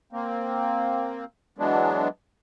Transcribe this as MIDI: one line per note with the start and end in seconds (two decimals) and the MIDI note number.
0.13 1.25 58
0.13 1.25 60
1.58 2.08 52
1.58 2.08 54
1.58 2.08 56
1.58 2.08 59
1.58 2.08 62